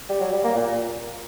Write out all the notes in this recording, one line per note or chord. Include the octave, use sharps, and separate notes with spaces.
G3
F#3
G3
A#3
A#2